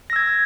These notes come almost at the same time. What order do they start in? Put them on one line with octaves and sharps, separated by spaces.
A#6 E6 G#6